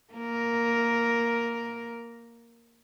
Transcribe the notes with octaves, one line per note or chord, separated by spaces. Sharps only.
A#3 A#4